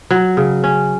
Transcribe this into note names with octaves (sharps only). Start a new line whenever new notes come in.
F#3
C#3
C#4